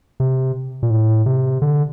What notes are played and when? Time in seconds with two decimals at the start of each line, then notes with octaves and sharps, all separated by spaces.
0.20 C3
0.83 A#2
0.90 A2
1.26 C3
1.62 D3